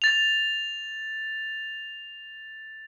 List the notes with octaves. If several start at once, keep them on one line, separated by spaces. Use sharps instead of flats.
A6 F7